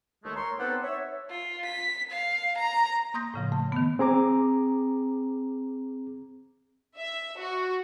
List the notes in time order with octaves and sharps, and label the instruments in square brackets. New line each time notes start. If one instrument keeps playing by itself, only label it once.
[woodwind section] D#2 G#3 A3
A#4 C#5 C6
B3 C4 D#4 G4 A4 F#5
C#5 E5
[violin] F4
B6
F5
A#5
[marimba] A#3 C6 D#6 G6 A#6
A2 C#3 F3
A3
D#3 B3
[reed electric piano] C4 G#4 A#5 D6
[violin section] E5
F#4